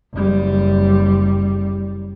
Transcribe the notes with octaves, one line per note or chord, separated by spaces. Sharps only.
F#1 G3